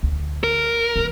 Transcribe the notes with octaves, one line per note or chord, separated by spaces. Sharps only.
D2
A#4
E3 A#3